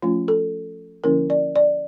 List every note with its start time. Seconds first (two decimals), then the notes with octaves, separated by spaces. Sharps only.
0.02 F3 A3 C#4 F4
0.28 A4
1.04 D3 F3 A#3 C#4 E4 A#4
1.30 D5
1.56 D5